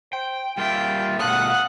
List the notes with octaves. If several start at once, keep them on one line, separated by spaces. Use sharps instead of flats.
C5 G5
G3 A#3 F4 E5 G5
B2 A3 F5 F#5 D#6 F#6